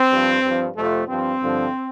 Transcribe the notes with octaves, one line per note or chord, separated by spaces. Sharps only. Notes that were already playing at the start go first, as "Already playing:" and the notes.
Already playing: C4
G2 F3
G2 F3
F2 C3 F3 A3
G2 F3 C4
G2 D3 F3